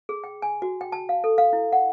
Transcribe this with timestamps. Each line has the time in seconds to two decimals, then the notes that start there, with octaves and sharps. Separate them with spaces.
0.09 G#4
0.24 G5
0.42 G#5
0.62 F#4
0.81 G5
0.92 A5
1.09 F5
1.24 A4
1.38 F5
1.53 E4
1.73 F#5